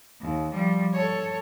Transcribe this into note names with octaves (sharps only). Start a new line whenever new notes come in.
D#2
F3 G3
A4 C#5